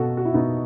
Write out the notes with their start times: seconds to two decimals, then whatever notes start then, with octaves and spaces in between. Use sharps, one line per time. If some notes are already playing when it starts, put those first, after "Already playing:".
Already playing: B2 F#4 A4
0.17 F#4
0.25 E4
0.34 B2 B3 D#4